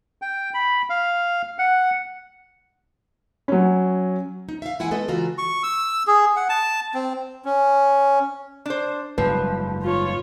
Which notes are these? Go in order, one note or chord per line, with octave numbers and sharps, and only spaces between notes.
G5
B5
F5
F#5
F#3 C#4
D#4
E5 F5
E3 G#3 E4 E5 F#5 G#5
G#3 B3 A4 B4 D#5
C#3 E3 F4 F#4 A#5
C#6
E6
G#4
F#5
A5
C4
C#4
D4 C5
F#1 G#2 F3 G3 B4
F4 C#5